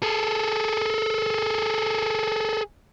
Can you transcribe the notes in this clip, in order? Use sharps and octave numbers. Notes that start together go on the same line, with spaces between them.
G#4 A4